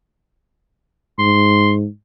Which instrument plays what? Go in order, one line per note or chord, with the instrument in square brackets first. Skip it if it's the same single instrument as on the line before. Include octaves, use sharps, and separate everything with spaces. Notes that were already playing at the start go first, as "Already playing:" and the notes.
[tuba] G#2 [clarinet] C6